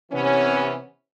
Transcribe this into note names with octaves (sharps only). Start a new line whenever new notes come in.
C3 E3 B3 C#4